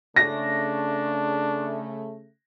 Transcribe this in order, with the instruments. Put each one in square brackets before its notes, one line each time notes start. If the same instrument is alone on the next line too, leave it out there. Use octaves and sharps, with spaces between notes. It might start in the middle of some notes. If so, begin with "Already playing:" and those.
[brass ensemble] C#3 A3 [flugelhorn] D4 [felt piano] A#6